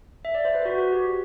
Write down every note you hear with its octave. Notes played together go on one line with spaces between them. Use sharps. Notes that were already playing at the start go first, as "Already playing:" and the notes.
E5
D5
C5
B4
F#4
F#4
G4